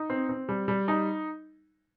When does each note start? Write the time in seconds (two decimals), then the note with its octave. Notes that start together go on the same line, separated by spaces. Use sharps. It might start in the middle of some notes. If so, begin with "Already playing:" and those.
Already playing: D#4
0.10 C4
0.29 C4
0.49 G3
0.68 G3
0.88 D#4